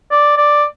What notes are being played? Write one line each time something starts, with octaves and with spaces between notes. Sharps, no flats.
D5
D5